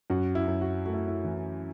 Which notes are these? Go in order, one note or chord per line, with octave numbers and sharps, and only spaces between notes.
F#2 F#4
E4
F#2
F#4
A3 F#4
E4
E4
E3